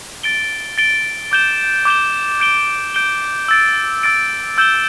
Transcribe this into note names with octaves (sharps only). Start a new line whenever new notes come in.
A6 D7 G7
A6 D7 G7
D6 G6 E7 G7
D6 G6 E7 G7
G6 D7 G7
G6 D7 G7
E6 A6 D7
E6 A6 D7
E6 G6 E7 G7